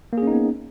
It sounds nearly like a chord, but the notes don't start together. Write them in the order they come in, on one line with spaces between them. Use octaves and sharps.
A#3 G#4 C#4 D#4 B3